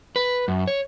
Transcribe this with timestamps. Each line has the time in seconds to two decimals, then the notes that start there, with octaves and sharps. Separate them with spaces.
0.16 B4
0.48 F#2
0.67 C#5